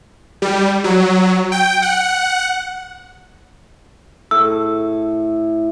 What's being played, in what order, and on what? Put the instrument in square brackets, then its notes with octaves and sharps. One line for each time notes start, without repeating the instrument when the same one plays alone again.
[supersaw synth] G3
F#3
G5
F#5
[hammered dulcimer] A2 [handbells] E6